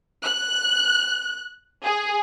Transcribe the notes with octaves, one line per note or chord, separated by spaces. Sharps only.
F#6
G#4